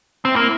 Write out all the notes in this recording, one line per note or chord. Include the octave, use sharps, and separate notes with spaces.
C4 E4
A#3